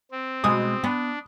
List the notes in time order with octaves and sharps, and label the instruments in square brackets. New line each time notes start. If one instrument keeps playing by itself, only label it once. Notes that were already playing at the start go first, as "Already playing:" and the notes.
[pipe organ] C4
[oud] B2 G#3 [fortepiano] D#6
[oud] B3 [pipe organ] D4